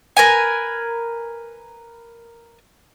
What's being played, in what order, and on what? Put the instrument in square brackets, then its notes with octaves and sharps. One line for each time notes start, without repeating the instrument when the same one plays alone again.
[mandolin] A#4 B4 G#5